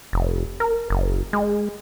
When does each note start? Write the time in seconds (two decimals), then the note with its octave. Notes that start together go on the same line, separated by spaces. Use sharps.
0.13 F1
0.60 A#4
0.90 F#1
1.33 G#3